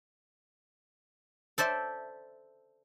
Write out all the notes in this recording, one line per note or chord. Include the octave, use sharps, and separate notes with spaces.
A4 C5 D5 E5